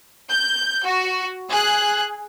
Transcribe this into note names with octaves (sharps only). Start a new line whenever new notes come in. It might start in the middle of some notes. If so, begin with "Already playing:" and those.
G6
F#4
G#4 F#6